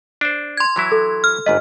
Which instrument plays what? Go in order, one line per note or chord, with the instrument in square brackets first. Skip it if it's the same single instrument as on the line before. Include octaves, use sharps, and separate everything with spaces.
[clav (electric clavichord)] D4 C5
[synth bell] C6 G#6
[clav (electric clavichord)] E3 F#3 E4
[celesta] A4
[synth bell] F6
[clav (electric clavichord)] G1 G#2 B4 [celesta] D#5